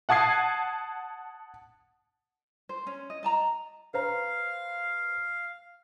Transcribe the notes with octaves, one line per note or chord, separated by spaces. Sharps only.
F#5 A5 D#6 G#6 C7
C5
C#4
D#5
D#5 A5 A#5
B4 C5 F5 A#5